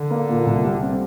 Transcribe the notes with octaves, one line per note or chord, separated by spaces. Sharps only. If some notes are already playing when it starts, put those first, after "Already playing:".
Already playing: D3
A#3
A#2
C2
G3
C4